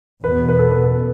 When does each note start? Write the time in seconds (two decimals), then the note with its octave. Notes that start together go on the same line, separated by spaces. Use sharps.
0.24 E2 B2 B3 B4
0.49 B4
0.59 A4
0.72 B4
0.83 A4